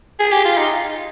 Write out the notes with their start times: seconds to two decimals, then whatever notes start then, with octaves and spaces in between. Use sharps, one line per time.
0.19 G#4
0.32 G4
0.45 F4
0.57 D#4